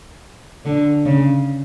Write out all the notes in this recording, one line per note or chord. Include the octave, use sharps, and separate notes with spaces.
D3
C#3